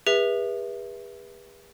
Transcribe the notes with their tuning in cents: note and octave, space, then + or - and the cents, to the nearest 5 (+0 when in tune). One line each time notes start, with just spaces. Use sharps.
G#4 -45 B4 -30 E5 +0